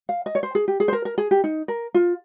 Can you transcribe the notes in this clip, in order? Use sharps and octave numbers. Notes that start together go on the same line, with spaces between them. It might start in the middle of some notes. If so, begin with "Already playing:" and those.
F5
D#5
C#5
C5
G#4
G4
G#4
C5
A#4
A#4
G#4
G4
D#4
A#4
F4